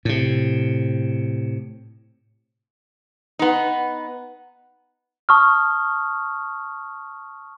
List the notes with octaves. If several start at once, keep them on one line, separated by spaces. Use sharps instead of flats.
A2 C3
B3 D#4
A5 C#6 D#6 F6